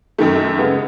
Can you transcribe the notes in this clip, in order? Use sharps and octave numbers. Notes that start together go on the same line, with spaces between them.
F#2 D#3 A3
C#3 G#3 B3